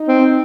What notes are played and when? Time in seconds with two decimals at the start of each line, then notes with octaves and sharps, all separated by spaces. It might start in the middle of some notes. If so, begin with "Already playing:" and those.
Already playing: D#4
0.08 C4